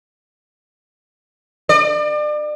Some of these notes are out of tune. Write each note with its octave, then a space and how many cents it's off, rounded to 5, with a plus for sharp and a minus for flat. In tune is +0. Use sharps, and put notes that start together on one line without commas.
D5 +35